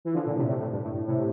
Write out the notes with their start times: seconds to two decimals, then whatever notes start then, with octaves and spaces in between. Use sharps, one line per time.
0.05 E3
0.14 D3 F3
0.26 A#2 D3
0.37 A2 C3
0.49 A2 C3
0.60 A2
0.72 G2
0.83 A2
0.95 A2
1.07 A2 C3